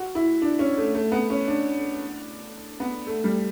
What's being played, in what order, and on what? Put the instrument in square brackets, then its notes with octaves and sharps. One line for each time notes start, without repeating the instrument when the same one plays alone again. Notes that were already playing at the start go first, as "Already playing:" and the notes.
Already playing: [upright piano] F#4
E4
D4
C#4
A3
A3
B3
C#4
D4
B3
A3
G3